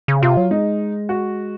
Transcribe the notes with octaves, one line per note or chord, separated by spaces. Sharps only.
C#3
C3 F4
F#3
G#3 D#4
F#4